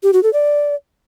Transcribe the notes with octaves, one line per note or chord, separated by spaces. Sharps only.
G4
F#4
A4
D5